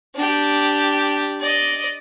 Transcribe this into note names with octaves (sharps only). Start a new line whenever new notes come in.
D4 G4
D5 D#5